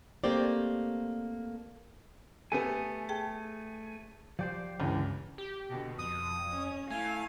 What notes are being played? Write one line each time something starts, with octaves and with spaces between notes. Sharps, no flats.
A3 A#3 C4 G4 C5 D5
A3 B3 G4 A4 G#5
G#4 G5 A5
F3 G4 C5 D5
C#2 G2 D3 E3
G4
B2 D3
F2 F3 D#6
C#4
A3 E4 F5 G#5